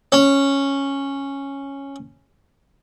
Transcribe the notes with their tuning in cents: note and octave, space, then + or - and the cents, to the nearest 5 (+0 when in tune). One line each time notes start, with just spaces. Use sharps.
C#4 -5